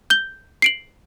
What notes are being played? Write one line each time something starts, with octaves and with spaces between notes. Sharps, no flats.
G6 G7
C7 D7 F#7